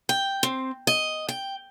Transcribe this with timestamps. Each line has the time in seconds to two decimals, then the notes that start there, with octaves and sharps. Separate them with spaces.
0.09 G5
0.43 C4
0.87 D#5
1.29 G5